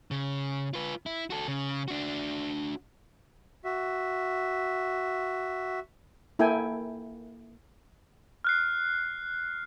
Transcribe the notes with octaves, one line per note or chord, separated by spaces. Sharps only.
C#3
F4 B4
E4
F#4 A4
C#3
D4 F#4
F#4 E5
A#3 E4 A4 G5 G#5
F6 F#6 C7